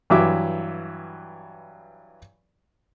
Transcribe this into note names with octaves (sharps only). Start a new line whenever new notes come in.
G2 E3 F#3 E5 D6